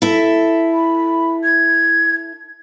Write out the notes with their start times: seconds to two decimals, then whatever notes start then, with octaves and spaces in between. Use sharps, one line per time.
0.02 E4 A4 E5
0.74 B5
1.44 G#6